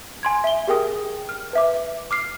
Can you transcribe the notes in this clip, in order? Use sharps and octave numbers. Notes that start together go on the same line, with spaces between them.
G#5 C6 G#6
E5 G7
G4 G#4 A#4 G5 D#6
F6
B4 E5 D6
D6 F6 C7